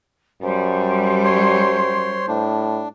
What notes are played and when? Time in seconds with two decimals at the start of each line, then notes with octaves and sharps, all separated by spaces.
0.43 F#2 G3 C5
1.25 C#5 C6
2.28 A2 D4